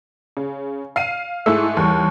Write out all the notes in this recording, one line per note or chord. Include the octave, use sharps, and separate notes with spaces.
C#3
F5 C7 D#7
G#2 A3 E4 E6
D#2 E3 G3 C#6